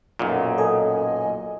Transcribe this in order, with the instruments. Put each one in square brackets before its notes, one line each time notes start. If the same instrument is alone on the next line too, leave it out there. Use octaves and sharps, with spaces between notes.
[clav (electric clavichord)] B1 F#2 A#2
[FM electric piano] A4 D#5 G#5